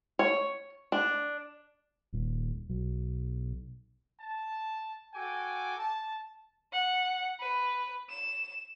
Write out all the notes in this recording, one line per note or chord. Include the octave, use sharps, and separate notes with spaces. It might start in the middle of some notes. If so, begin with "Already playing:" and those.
C#5
D4
D#1
B1
A5
F#4 A4 G5 G#5 D6
A5
F#5
B4
E7